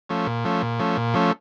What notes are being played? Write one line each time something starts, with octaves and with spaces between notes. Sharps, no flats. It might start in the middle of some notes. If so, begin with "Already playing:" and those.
F3 A3 C#4
A#2
F3 A3 C#4
A#2
F3 A3 C#4
A#2
F3 A3 C#4